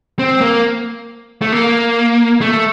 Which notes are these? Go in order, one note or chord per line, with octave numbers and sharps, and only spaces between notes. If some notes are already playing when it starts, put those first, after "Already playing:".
C4
A#3
A3
A#3
A3